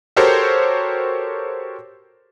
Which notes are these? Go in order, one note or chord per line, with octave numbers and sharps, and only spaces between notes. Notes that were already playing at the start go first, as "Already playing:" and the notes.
F#4 G4 A4 A#4 C5 C#5